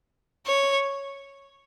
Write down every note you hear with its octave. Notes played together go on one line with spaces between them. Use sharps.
C#5